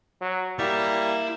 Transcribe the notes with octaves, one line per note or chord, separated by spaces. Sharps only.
F#3
G3 A#3 E4